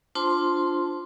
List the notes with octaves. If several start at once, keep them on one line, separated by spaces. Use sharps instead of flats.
D4 F4 C5 A5 C6